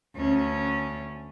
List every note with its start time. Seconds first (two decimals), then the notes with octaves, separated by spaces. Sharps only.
0.16 D2 C#4